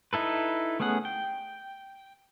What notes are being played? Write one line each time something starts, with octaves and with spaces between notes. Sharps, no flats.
D#4 E4 A4 B4
A3 B3 C#4 G#4 F#5
G5